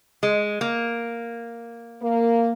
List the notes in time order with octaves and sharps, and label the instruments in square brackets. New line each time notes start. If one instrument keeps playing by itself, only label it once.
[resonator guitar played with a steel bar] G#3
A#3
[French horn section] A#3